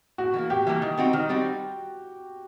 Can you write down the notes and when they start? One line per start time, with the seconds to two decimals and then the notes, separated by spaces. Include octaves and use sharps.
0.18 A2 F#4
0.34 E3 G3
0.38 A#3
0.50 A2 G4
0.67 E3 G3 A#3
0.82 D#3
0.97 G3 C4 D#4 F#4
1.13 D#3
1.29 G3 C4 D#4 F#4